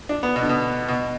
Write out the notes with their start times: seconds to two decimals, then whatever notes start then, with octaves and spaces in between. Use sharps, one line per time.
0.09 D4
0.23 B3
0.36 B2
0.42 D3
0.49 B2
0.88 B2